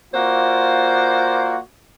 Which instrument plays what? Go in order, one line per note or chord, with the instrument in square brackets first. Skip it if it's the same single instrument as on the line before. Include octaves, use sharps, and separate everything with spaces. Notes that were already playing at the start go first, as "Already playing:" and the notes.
[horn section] A#3 F4 F#4 C5 D5